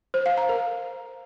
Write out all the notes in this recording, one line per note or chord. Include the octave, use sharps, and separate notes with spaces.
C5
F5
A#5
A#4